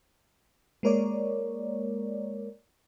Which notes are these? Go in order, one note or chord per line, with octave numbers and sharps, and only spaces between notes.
G#3 A#3 A#4 C#5 D5